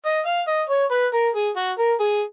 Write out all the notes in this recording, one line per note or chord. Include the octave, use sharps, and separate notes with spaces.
D#5
F5
D#5
C#5
B4
A#4
G#4
F#4
A#4
G#4